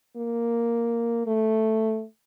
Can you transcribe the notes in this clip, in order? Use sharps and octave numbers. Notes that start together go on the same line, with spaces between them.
A#3
A3